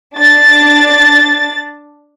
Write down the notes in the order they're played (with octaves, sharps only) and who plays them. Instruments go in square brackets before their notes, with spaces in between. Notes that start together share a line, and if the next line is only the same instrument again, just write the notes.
[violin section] D4 A6